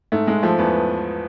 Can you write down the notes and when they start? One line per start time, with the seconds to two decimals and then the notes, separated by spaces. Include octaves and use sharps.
0.12 G#2 A3
0.27 G#2 G#3
0.43 F3 A3
0.59 E2 B3